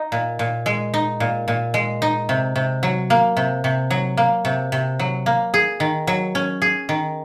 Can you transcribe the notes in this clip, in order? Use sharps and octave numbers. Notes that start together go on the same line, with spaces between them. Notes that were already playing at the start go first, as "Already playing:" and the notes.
Already playing: D#4
A#2
A#2
G#3
D#4
A#2
A#2
G#3
D#4
C3
C3
F#3
A#3
C3
C3
F#3
A#3
C3
C3
F#3
A#3
G#4
D#3
F#3
C#4
G#4
D#3